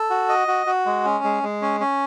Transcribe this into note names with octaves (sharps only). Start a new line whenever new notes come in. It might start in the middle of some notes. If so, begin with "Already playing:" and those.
Already playing: A4
F#4
D#5
F#4
F#4
G#3
C#4
G#3
G#3
C#4
C#4